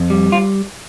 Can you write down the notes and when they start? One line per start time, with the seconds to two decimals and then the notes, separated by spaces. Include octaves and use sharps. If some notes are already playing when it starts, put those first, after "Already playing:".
Already playing: F2
0.10 G3
0.32 F4